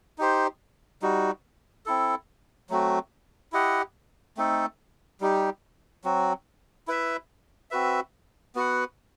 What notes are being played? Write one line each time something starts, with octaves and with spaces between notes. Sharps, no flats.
D#4 G4 C5
G3 D#4 F#4
C4 E4 A4
F#3 A3 C4 F#4
E4 G4 D#5 F#5
A3 C4 D#4 A4
G3 D#4 G4
F#3 C4 F#4
E4 B4 E5
C4 F#4 B4 E5
B3 F#4 B4 F#5